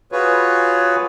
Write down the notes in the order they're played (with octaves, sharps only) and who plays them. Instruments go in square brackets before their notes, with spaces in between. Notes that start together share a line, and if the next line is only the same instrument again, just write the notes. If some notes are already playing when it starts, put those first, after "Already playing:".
[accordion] F4 F#4 G#4 B4 C#5